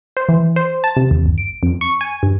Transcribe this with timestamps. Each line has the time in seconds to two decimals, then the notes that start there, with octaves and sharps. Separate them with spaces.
0.17 C5
0.29 E3
0.56 C5
0.84 A5
0.97 C3
1.11 D#2
1.26 G1
1.38 D7
1.63 F2
1.81 C#6
2.01 G#5
2.23 G2